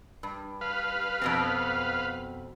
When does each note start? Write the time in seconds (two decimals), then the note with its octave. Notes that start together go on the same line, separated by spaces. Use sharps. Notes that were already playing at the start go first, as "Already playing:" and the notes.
0.23 G2
0.61 B4 F5
1.22 F2 B2 C4